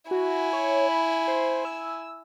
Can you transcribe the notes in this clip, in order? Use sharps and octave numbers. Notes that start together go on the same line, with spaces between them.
E4 F#4 G#5
C#5
B5
C5
E6